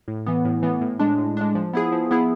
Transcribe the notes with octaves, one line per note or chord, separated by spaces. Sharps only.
A2
E3 B3
A2
E3 B3
A2
G#3 D4
A2
G#3 D4
F3
B3 E4 G#4
F3
B3 E4 G#4